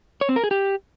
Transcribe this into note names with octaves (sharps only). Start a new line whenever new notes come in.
C#5
C4
A#4
G#4
G4